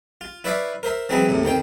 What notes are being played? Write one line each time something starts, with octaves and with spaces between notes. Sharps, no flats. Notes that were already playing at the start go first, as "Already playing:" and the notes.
F4
E4 B4 C#5 D5 E5 F5
A#4 C5 E5
E3 F#3 G#3 C4 G#4 B5
D#2 A2 C3
F2 D#3 C5 G5